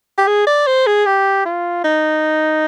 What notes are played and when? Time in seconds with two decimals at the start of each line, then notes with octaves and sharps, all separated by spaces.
0.18 G4
0.27 G#4
0.47 D5
0.67 C5
0.86 G#4
1.06 G4
1.45 F4
1.84 D#4